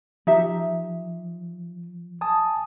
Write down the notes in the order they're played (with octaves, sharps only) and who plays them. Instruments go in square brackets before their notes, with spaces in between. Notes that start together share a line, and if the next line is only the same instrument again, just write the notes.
[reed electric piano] F3 [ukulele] D#4 G4 E5
[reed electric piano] G#5 A5 D#6